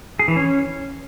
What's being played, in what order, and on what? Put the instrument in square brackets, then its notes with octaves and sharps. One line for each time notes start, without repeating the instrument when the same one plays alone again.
[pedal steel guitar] G#4
E3
C#4